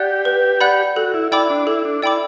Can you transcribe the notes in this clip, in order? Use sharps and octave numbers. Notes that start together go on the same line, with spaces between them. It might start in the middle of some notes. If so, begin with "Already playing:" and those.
Already playing: G4 D5 F#5 F#6
B4
D5 F#5 B5 F#6
F#4 A4
E4
E4 D5 G5 B5 D6
D4
E4 A4
D4
E4 D5 G5 B5 D6